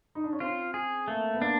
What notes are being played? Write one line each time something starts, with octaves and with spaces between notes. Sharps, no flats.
D#4
D4
C#4
C4 F4
G#4
A3 A#3
B3
A#3 D4